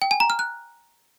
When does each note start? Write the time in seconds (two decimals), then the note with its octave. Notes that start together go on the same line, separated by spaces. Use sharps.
0.02 G5
0.11 G#5
0.20 A#5
0.30 F6
0.39 F#6